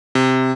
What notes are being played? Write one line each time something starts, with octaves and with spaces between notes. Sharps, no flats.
C3